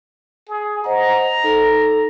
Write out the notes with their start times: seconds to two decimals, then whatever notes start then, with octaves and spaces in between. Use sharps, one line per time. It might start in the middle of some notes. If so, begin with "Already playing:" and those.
0.49 G#4
0.84 C5 D#5 F#5 A#5
1.44 D#4 A4